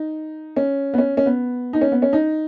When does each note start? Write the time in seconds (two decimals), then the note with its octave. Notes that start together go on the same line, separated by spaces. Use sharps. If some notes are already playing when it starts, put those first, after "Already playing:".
Already playing: D#4
0.56 C#4
0.94 B3
0.98 C#4
1.17 C#4
1.26 B3
1.73 D#4
1.81 C#4
1.92 B3
2.02 C#4
2.13 D#4